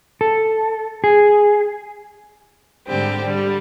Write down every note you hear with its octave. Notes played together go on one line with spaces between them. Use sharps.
A4
G#4
G#2 D3 G3 C4 G4
D3 G3